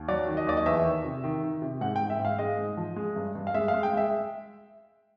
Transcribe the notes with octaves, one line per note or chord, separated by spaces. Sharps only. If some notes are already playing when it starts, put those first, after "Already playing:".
Already playing: D#2
F#3 D5
D#3
D#5
D#2 D5
D#5
E2 E5
D#3
C3
D#3
D#3
C3
G#2 F#5
G5
G#2
E5
G#2
F5
G#3 D#5
G#2
F3
G#3
G2
G2
F5
G#3 E5
F5
G#3
G5
G#3 E5